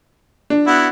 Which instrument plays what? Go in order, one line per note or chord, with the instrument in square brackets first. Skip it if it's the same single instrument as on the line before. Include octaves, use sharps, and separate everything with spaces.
[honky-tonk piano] D4
[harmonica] B3 E4 F#4